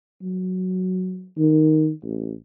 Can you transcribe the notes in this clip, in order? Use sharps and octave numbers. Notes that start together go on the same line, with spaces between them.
F#3
D#3
A1